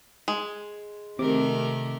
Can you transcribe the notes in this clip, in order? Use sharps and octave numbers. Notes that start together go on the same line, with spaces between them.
G#3
C3 D#3 A3 A#4 D6